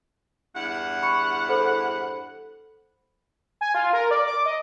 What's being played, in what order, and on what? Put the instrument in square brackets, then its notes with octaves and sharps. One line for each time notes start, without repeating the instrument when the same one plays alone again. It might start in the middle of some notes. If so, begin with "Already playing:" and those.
[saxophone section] E2 G2 F#5
[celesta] B5 C#6 C#7
A4 C5 B5
[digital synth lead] G#5
F4
A#4
D5
D6
D#5